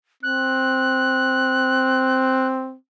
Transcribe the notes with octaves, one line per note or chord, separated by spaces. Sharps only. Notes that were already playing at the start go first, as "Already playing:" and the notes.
C4 F#6